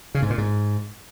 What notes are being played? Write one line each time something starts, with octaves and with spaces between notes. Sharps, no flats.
C#3
G#2
A#2
G#2